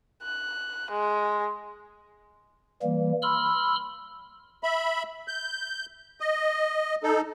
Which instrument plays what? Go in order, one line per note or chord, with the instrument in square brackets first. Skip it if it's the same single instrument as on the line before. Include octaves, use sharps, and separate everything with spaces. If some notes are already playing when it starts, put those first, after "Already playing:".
[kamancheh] F#6
G#3
[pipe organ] E3 G3 A#3
B5 C6 E6 F6
[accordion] E5 B5
G6
D#5
D#4 A4